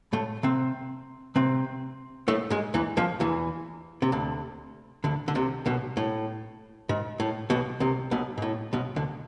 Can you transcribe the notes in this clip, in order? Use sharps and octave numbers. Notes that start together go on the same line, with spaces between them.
A2 A3
C3 C4
C3 C4
A2 A3
G#2 G#3
E2 E3
F2 F3
E2 E3
C3
D2 D3
D2 D3
D3
C2 C3
B1 B2
A2
G#2
A2
B1 B2
C2 C3
B1 B2
G#2
A2
B1 B2
D2 D3